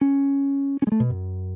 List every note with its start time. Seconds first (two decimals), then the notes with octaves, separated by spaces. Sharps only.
0.01 C#4
0.82 C#4
0.87 G#3
0.92 A3
1.00 B2
1.10 F#2